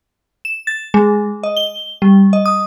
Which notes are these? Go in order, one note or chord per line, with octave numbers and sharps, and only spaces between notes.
E7
A6
G#3
D#5
G7
G3
D#5
D#6